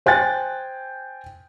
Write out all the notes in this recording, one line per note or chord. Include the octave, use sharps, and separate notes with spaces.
C5 G5 G#5 F#6 A6